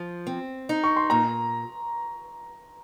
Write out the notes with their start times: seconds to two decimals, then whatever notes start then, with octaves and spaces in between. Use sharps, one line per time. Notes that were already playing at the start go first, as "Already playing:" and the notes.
Already playing: F3
0.27 C4
0.69 D#4
0.84 C#6
0.96 C6
1.10 A#2 A#5